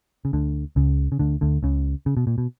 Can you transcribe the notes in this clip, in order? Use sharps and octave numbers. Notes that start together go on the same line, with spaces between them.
C#3
D2 D3
C#2 C#3
C#3
D2 D3
D2 D3
C#2 C#3
C#3
B2
A#2
B2